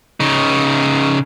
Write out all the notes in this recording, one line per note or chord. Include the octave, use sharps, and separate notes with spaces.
C#3 D#4